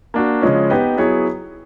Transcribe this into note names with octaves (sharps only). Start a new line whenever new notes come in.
A#3 D4 F#4
C#3 F3 G#3 C#4
B3 D#4 G4 B4 D#5
F#3 B3 E4 G#4 C#5